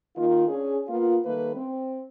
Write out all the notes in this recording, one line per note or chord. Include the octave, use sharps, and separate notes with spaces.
D#3 A#3 F4
C#4 D4 G#4
A#3 B3 F4
D#3 G3 A3 A#3 B4
C4